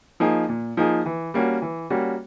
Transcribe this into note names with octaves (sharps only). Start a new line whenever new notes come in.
F3 A#3 D#4 G#4
A#2
F3 A#3 D#4 G#4
E3
G3 A#3 C#4 F#4
E3
G3 A#3 C#4 F#4